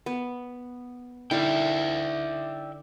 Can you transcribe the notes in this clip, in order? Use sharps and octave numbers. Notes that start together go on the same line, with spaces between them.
B3
D3 D#4 E4 D5 E5 G5